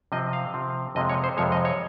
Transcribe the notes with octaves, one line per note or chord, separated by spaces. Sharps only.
C3 F3 C4 D#5
F5
C3 F3 C4
F2 C3 F3 G#3 D#5
C#5
C5
F2 C3 F3 G#3 C#5
D#5
C#5